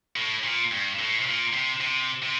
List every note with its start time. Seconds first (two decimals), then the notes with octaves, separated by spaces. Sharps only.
0.16 A2
0.44 A#2
0.72 G2
0.99 A2
1.20 C3
1.26 A#2
1.53 C3
1.81 C3
2.22 C3